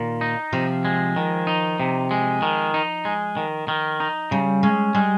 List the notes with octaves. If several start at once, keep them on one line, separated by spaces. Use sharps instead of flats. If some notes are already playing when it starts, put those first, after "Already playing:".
Already playing: A#2 D#3
D#4
C3 F3
G#3
D#3
D#4
C3
G#3
D#3
D#4
G#3
D#3
D#3
D#4
C#3 G3
G#3 C#4
G3 G#3